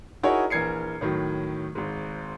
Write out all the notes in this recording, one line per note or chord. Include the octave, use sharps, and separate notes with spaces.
D#4 E4 F#4 G#4 A#4 C#5
A#1 E3 A#4 G#6 C7 C#7
A2 D#3 F#3
G#1 G#2